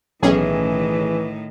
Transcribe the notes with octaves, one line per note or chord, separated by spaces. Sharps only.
B1 A2 D#3 E3 A3 C#4 G#4